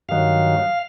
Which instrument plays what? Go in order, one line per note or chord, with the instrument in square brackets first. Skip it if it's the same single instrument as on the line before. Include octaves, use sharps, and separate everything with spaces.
[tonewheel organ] G2 D#3 F#3 F5